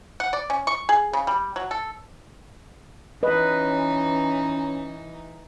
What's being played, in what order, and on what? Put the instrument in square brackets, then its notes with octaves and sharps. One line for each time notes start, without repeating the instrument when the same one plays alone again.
[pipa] F#5
D5
C#4
C#6
G#4
C#3
G3
F#3
A4
[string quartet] E3 D#4 [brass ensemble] C#4 [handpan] B4 D#5